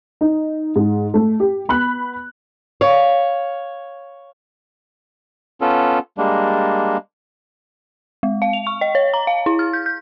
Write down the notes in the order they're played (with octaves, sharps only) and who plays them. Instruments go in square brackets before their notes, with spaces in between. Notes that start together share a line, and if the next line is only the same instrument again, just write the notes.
[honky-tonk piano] D#4
G#2
A3
G4
B3 B5 F#6 F#7
[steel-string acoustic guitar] C#5 F5
[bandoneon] B3 C#4 F4 A4
G3 G#3 A#3 D4
[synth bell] G#3
F5
F7
C#6
D#5
C#5
A#5
F5
E4
F6
G6
G6